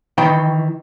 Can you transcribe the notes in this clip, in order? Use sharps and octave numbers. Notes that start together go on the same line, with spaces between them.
D#3 E3 G5